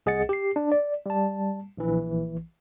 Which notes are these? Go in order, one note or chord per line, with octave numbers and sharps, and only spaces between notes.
C2 G#4 D#5 F#5 A6 C#7
G4 C7
D4
D5
G3 A5
A#1 E3